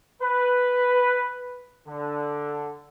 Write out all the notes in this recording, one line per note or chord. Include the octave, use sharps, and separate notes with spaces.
B4
D3